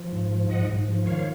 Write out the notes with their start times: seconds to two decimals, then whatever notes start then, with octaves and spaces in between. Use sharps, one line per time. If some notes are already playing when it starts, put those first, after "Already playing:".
Already playing: F3
0.12 G#2
0.32 F3
0.50 G#2 D#5 F#5
0.69 G#2
0.88 F3
1.06 D#3 C#5 F5